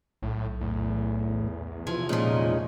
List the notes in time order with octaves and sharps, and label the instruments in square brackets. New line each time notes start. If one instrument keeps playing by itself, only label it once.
[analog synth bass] B1 [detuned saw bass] A2
[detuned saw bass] E2 [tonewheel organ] A2
[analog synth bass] C3 [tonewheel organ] E3 G#6 [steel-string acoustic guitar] F3
[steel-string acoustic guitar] A#2 F3 [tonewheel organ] G#3 C#4 D#4